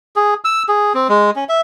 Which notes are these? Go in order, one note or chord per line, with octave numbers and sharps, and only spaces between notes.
G#4
E6
G#4
C4
G#3
C#4
E5